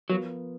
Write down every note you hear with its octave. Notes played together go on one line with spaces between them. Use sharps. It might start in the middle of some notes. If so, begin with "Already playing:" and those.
F3 F#3 B3 F4 A#4